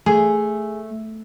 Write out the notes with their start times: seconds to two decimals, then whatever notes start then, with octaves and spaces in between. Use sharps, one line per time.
0.06 A3 G#4